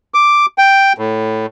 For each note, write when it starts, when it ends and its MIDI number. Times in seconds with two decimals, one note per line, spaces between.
0.14 0.46 86
0.58 0.93 79
0.98 1.46 45